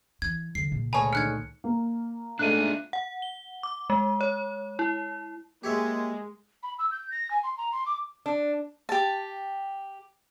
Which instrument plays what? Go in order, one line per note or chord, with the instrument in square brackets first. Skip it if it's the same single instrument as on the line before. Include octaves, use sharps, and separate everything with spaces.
[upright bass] E3 [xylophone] G#6
[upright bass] D3 F3 [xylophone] C7
[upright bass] C#2 A#2
[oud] D2 G#3 C#5 [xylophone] G#5 A5 B5
[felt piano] D#3 C#7 [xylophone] F6 F#6 G#6
[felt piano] A#3
[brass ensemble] G#2 A3 [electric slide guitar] D4 F4 [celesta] F#6 D#7
[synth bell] F#5
G7
D6
G#3
C#5
E4
[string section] G#3 [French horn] A#3 [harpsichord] G4 C#5 E5
[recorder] B5
E6
G6
A#6
G#5
C6
A#5
C6
D6
[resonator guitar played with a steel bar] D4
[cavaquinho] G4 A5